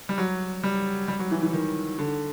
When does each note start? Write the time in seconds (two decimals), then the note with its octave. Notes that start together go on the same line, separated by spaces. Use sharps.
0.09 G3
0.18 F#3
0.63 G3
1.08 G3
1.19 F#3
1.31 E3
1.42 E3
1.53 D#3
1.99 D3